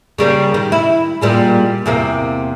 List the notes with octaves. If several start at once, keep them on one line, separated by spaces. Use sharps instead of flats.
C#3 G3 A#3
D#3
E4
A#2 G3 G#3
E2 C3 A#3